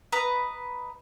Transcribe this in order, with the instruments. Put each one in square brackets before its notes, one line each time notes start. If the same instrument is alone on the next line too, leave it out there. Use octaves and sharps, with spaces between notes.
[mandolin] B4 D#5 A#5